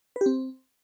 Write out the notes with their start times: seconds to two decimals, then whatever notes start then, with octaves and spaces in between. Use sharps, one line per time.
0.16 B4
0.21 G4
0.26 C4